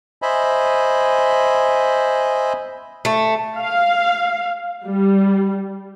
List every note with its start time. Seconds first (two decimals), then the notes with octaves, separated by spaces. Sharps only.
0.22 C5 D#5 E5 G#5 B5
3.05 A3
3.59 F5
4.86 G3